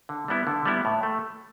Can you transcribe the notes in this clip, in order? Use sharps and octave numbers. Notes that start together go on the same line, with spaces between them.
D3
G3 B3 E4
D3
G3 B3 E4
A2
A3